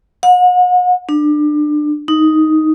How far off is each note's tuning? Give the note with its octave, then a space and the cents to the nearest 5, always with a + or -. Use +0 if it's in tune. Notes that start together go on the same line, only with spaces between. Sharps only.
F#5 -40
D4 +25
D#4 +5